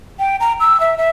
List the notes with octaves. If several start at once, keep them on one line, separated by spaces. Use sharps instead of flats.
G5
A#5
E6
E5
E5